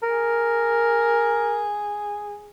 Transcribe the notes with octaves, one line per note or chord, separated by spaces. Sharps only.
G#4 A#4